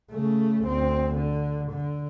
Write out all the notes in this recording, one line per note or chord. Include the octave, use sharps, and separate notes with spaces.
C#3 A3
D2 C4
D3
D3